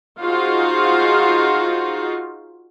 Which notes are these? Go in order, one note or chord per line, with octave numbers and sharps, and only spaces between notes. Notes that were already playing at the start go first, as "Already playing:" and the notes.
D#4 F4 F#4 G#4 C5 F5